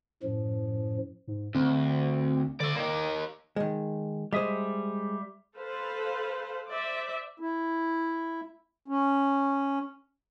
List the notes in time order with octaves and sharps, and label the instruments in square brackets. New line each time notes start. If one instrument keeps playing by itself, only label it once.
[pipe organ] F#2 A2 F3
[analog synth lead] G#2
[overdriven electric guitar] D2 [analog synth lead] C4
[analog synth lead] D3 [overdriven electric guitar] D5 E5
[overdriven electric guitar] A#3 D#4 [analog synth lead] D6
[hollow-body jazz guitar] D#3 G#3
[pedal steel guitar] G3 E5 D#6 [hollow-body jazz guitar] G#3 C5
[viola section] A4 B4 C5 F5
C5 D5 E5
[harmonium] E4
C#4